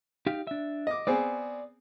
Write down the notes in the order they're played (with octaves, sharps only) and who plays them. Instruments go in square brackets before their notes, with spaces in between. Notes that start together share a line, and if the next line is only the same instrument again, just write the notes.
[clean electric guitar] D#4 G4 F5
D4 E5
[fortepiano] D#5 D6
[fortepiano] B3 C4 G#4 [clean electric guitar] D5